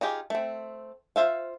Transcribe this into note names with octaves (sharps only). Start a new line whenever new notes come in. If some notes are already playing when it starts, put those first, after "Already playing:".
D#4 F4 G4 G#4
A3 C4
F4 C5 E5 F5